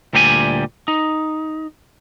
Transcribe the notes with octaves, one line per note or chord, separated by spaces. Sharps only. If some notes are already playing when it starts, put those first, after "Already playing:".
D2 A#2 G3 G4 A4 G#5
D#4